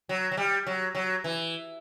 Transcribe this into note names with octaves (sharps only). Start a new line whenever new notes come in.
F#3
F#3
G3
F#3
F#3
E3